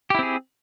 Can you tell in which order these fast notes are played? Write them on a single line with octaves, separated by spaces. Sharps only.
G4 E4 C4 G#4